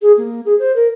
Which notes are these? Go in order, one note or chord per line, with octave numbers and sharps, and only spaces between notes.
G#4
A#3
G#4
C5
A#4